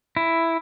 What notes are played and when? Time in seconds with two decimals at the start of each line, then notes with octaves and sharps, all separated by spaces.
0.17 E4